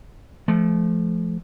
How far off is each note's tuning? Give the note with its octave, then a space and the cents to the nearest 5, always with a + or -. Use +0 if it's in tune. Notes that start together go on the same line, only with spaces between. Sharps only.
F3 -20 A3 -30